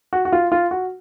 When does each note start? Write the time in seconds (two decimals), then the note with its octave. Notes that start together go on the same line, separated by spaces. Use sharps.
0.13 F#4
0.25 F#4
0.32 F4
0.52 F4
0.71 F#4